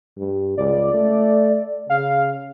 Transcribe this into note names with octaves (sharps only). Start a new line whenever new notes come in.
G2
C#2 D5
A3
C#3 F5